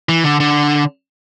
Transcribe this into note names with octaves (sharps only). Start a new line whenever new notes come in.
E3
D3
D3